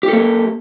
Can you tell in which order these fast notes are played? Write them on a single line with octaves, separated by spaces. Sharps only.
G4 A4 A#3